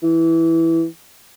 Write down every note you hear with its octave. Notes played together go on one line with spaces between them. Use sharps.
E3